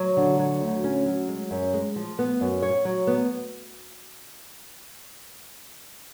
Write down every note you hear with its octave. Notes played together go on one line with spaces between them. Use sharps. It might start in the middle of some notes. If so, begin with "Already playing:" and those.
Already playing: F#3
D3
F#3
D2
C#4
F#3
G#3
F#2
G#3
F3
B3
F#2
C#5
F#3
B3